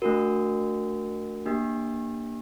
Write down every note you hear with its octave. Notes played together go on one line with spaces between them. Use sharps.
A3 D4 F#4 A#4
A#3 D4 G4